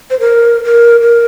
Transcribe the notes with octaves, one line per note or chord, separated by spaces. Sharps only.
C5
A#4
A#4
A#4